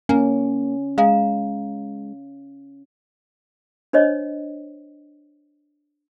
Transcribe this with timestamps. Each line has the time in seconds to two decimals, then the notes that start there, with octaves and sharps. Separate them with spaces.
0.09 A#3 C#4 G#5
0.98 G#3 F5 A#5
3.93 D4 C5 C#5 D#5